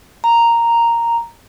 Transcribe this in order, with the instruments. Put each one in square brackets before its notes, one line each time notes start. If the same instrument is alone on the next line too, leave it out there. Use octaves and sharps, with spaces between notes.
[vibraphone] A#5